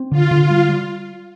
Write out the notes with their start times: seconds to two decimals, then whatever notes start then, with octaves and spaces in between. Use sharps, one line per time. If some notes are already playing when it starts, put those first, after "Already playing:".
Already playing: C4
0.12 D3 F4
0.31 D3
0.40 F4
0.50 G3
0.69 G3